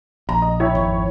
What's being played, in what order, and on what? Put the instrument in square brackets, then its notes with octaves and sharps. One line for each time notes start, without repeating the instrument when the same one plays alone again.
[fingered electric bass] A#1 [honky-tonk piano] A#5
[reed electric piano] D#5
[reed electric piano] E4 G5 B5 [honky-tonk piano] C#5
[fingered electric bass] G#1 F2